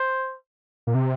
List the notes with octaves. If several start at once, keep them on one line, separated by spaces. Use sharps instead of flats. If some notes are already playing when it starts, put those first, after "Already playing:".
Already playing: C5
A#2
C3